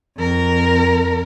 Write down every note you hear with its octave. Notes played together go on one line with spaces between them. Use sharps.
F2 A#4